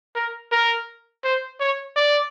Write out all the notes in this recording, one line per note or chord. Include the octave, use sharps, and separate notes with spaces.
A#4
A#4
C5
C#5
D5